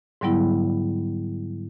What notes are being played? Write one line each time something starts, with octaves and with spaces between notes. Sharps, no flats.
G#2 D3 F#3 G3 B3 E4